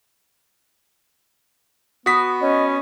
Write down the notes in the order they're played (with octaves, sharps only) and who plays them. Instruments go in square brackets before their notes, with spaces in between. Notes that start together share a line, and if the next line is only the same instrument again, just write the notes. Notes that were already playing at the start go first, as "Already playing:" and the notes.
[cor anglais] B3 [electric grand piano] F#4 B6 [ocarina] D#6
[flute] C#4 [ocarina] D#5